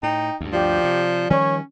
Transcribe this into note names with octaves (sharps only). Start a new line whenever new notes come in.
A2 D#4 G5
D2 G2
F3 G4 D5
C3
D#3 F3 G3 C#4 C#5